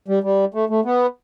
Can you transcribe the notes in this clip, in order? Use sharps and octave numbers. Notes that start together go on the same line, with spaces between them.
G3
G3
A3
A3
B3